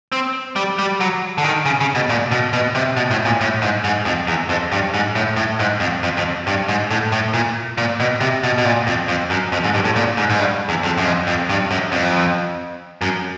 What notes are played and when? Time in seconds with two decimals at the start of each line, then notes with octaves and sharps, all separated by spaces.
0.12 C4
0.56 G3
0.79 G3
1.00 F#3
1.38 D3
1.44 D#3
1.66 C#3
1.81 C#3
1.95 B2
2.09 A#2
2.31 B2
2.53 B2
2.75 C3
2.97 B2
3.11 A2
3.25 A#2
3.41 A2
3.62 G#2
3.84 G#2
4.05 F2
4.27 E2
4.49 F2
4.72 G2
4.94 G#2
5.15 A2
5.36 A2
5.59 G#2
5.80 F2
6.03 F2
6.17 F2
6.47 G2
6.68 G#2
6.91 A2
7.12 A2
7.34 A#2
7.78 A#2
8.00 B2
8.20 C3
8.44 B2
8.58 B2
8.65 A#2
8.87 F2
9.08 F2
9.30 F#2
9.52 F2
9.64 G#2
9.74 G2
9.85 A2
9.96 A#2
10.17 G#2
10.30 G#2
10.39 G2
10.69 E2
10.83 F2
10.98 F#2
11.05 F2
11.27 F2
11.49 G2
11.71 F#2
11.92 F2
13.02 F#2